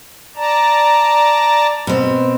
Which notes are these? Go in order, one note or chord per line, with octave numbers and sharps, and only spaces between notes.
D5 A5 A#5
B2 C4